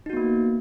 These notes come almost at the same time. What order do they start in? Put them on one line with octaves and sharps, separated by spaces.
D#4 F#4 B3 A#3